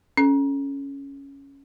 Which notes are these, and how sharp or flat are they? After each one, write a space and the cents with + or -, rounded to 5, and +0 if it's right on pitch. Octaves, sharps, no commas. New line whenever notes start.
C#4 +0 A4 -30